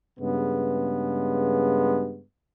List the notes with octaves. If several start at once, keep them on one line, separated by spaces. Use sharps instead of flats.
G2 C#3 G#3 B3